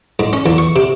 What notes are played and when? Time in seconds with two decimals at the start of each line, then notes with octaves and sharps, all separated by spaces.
0.19 G#2
0.33 C#4
0.46 E2
0.58 C#6
0.76 C3